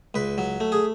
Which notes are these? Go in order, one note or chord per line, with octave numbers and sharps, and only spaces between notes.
C#2 B4
F#3
A3
G#4